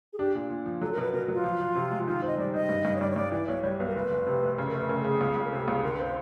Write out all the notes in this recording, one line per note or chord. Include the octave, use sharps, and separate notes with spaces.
G#4
D4 G4
A#2
A#2
F3
F#3 A4
A#4
B2 B4
B2 A#4
F#3
F4
F3
F3
C3
G#3
D#3 F4
C4
D#5
G3 D5
D#3 D#5
G2
G2
C#5
G2 D5
C#5
G2 D5
E3 D5
B1 C#5
G3 C#5
B1 B4
A#4
F1 B4
F1
C3
F1
C#3 B4
A#4
A3 B4
C#3 A#4
A4
C#3 G#4
C#2
C#2
A#4
C3 A4
C#2 G#4
D3 A#4
B4
C4
C5